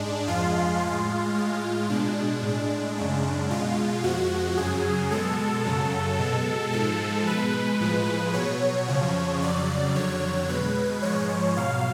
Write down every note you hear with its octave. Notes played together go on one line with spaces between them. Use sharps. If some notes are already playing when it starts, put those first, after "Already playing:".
Already playing: G#2 G#3 D4
F2 F3 G#3 F4
A2 G#3 F4
A2 G#3
B2 G#3 D4
A2 G#3
F#2 C#3 G#3
B2 G#3 F4
F2 F3 G#3 F#4
F#2 C#3 F#3 G#4
B2 G#3 A4
F#2 C#3 F#3
B2 G#3
G#2 F3 G#3 A4
B2 G#3 B4
A2 F3 G#3
B2 F#3 C#5
F2 C#3 F3
F2 C#3 F#3 D5
F2 D3 F#3 C#5
B2 G#3 B4
G#2 F3 G#3 C#5
B2 F#3 F5